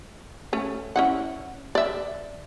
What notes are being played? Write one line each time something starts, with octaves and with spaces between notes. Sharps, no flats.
A3 C#4
C#4 E4 F#5
D5 E5